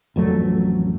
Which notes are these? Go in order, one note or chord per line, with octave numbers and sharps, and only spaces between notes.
A1 F2 F#3 A3